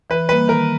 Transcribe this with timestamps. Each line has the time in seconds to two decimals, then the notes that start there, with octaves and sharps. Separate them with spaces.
0.10 E3 B4
0.29 G3 A#3 B4
0.48 D#3 A#4